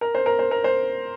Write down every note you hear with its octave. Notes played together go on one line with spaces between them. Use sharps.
A#4
C5
A#4
C5
A#4
C5